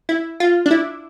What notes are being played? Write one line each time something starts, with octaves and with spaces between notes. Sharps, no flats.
E4
F4
D4
E4